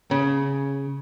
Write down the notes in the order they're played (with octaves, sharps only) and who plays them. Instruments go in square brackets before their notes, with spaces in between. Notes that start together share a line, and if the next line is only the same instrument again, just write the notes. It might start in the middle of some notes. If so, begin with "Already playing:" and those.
[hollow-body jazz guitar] C#3